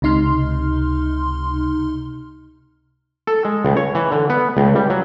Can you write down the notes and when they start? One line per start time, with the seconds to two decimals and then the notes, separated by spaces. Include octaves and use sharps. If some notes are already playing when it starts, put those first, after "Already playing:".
0.02 C#2 C3 D#4 C6 F6
3.27 A4
3.45 G#3
3.65 C#2
3.77 C#5
3.95 E3
4.12 D3
4.30 B3
4.57 C#2
4.76 G3
4.90 F#3